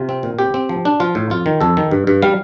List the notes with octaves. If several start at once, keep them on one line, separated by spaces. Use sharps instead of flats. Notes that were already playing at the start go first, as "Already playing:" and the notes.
Already playing: C3 F4
C4
A#2
C4 G4
C4
F3
D4
F3 F4
A2
F2 F4
D#3
F2 A4
D#3
G2
G2
G3 F5